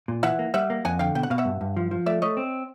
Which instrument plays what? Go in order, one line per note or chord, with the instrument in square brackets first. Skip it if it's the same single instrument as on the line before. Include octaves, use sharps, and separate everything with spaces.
[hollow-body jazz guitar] A#2
[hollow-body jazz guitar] E3 [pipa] E5 F#5
[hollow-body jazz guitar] A#3
[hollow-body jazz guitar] G3 [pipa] E5 F#5
[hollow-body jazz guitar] A#3
[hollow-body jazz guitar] F2 [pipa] F#5 G#5
[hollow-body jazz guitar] D3 [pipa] F5 G5
[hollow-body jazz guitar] B2 [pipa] G5
[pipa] F#5
[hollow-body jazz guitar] B2 [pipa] F5
[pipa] E5 F#5
[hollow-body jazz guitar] G2
G2
F3
F3
[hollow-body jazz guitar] A3 [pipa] D5 E5
[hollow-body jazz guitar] A3 [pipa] C#5 D#5
[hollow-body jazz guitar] C4